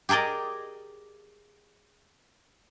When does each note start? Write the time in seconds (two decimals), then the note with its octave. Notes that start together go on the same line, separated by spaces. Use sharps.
0.09 G4 G#4 A#4 D5 D#5